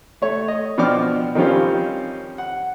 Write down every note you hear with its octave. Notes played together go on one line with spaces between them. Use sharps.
A3 C#5
D#5
B2 F3 D4 G5 D6 F6
D#3 F3 G3 C4 C#4 F4
F#5